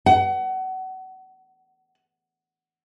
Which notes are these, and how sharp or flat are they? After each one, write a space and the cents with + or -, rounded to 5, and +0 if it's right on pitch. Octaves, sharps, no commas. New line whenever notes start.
F#5 +30